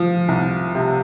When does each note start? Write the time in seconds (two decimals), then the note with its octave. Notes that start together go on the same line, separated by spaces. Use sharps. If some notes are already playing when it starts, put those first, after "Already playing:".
Already playing: F3
0.28 C2
0.75 C3